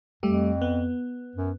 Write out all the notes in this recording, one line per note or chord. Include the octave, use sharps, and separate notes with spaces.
F2 G3 A3 G4
B3
F#2